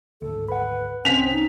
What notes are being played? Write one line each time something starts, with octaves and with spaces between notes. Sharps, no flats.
G#1 D2 A4
B4 F#5 B5
C2 C4 C#4 B6 F7
D#4